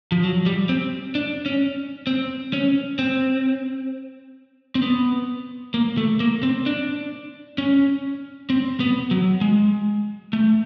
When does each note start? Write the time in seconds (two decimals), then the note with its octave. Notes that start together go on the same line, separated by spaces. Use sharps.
0.12 F3
0.23 F#3
0.46 G3
0.69 C4
1.15 D4
1.46 C#4
2.07 C4
2.53 C#4
2.99 C4
4.75 C4
4.82 B3
5.74 A#3
5.97 A3
6.20 A#3
6.43 C4
6.66 D4
7.58 C#4
8.50 C4
8.80 B3
9.11 F#3
9.41 G#3
10.33 A3